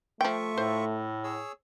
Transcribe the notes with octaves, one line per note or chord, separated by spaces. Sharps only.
F3 A3 F4 E5 G5 C#6
A2 C5
G#4 C#5 E6